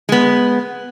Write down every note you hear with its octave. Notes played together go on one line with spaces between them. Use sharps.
G#3 B3